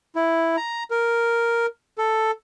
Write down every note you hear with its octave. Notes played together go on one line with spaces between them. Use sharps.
E4
A#5
A#4
A4